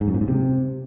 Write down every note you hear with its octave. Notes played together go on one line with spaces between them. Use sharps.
G#2
F#2
A#2
G#2
C3